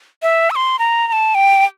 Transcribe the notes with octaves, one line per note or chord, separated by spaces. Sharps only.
E5
E6
C6
A#5
A#5
A5
G5